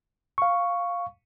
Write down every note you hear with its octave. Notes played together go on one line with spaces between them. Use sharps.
F5 C#6